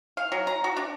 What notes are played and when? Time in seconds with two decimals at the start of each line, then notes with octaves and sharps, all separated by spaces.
0.17 F5
0.32 F#3
0.47 A#5
0.64 F#4
0.77 D4